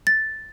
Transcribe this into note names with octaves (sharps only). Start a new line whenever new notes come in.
A6